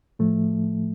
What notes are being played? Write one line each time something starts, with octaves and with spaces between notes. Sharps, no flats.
A2 F3 A3